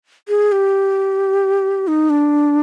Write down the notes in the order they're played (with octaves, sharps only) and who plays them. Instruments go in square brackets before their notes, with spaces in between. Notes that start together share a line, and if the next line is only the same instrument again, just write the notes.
[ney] G#4
G4
D#4
D4